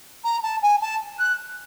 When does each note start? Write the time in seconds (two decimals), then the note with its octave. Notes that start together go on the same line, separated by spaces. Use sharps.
0.24 A#5
0.43 A5
0.62 G#5
0.82 A5
1.19 F#6